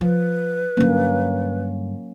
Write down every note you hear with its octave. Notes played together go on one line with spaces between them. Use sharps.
F3 B4
G2 D3 F#3 A#3 C#4